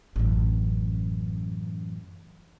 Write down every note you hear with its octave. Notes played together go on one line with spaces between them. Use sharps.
A1 F#2